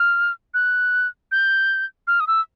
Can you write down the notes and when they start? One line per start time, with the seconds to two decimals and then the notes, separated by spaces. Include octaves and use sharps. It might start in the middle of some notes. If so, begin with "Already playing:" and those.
Already playing: F6
0.54 F#6
1.32 G6
2.07 F6
2.20 D#6
2.27 E6